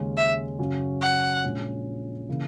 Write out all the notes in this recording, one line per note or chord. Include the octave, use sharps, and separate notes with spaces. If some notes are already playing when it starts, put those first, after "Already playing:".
Already playing: D#2 C#3 G#3 C#4
E5
F#2 C#3 F#3 C#4 F#4
F#5
A#1 A#2 G#3 C#4
C#3 E3 A#3